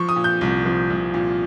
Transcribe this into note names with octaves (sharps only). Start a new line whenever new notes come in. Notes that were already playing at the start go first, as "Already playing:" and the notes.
Already playing: F3 C#6
D#6
A#2
G6
C2
F3
C2
A#2